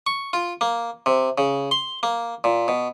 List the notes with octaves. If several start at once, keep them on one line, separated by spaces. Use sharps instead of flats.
C#6
F4
A#3
C3
C#3
C6
A#3
A#2
B2